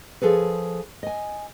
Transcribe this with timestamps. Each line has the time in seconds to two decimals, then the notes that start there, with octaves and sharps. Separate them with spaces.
0.22 F3 G#4 A4 B4
1.03 D#5 G#5